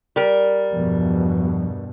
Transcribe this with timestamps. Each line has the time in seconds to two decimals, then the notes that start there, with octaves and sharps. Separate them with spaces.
0.16 G3 A#4
0.72 E2 G2 B2 F3